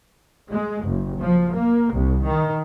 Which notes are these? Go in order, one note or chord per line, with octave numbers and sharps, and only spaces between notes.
G#3
F#1
F3
A#3
C2
D#3